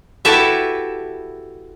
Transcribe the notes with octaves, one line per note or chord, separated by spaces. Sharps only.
E4 F#4 G4 A4 B4 E5